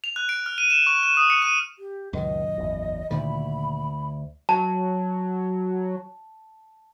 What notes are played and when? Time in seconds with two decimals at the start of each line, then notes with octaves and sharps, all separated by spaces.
0.04 F7
0.16 F#6
0.29 D7
0.46 F6
0.58 D#7
0.70 E7
0.87 C#6
1.03 E7
1.17 D#6
1.30 C#7
1.42 D#7
1.79 G4
2.13 C#2 F#2 A#2 D#3 D#5
2.58 G#1 E2
3.11 D2 A#2 D#3 F3 B5
4.49 F#3 A5